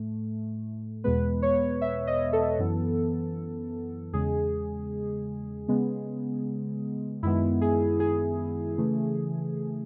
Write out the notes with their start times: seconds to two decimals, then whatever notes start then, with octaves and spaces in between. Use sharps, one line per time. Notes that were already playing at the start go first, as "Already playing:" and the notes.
Already playing: A2 A3
1.04 E2 B2 G#3 B3 B4
1.42 C#5
1.81 E5
2.07 D#5
2.33 A4
2.58 F#2 E3 B3
4.13 E2 C#3 G#3 G#4
5.68 C#3 G#3 B3
7.23 F#2 D#3 G#3 B3 E4
7.61 G#4
8.00 G#4
8.77 C#3 E3 A3